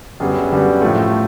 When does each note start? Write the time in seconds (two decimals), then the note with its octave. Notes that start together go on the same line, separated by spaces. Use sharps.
0.20 F#2 D3 G3 B3 G#4
0.52 F#2 D3 G3 B3
0.81 A2 F3 A3